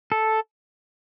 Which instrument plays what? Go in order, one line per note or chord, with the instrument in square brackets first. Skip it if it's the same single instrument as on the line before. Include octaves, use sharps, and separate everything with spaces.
[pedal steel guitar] A4